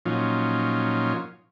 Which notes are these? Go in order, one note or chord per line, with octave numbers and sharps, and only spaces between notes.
A#2 F3 F#3 C#4 D#4 F4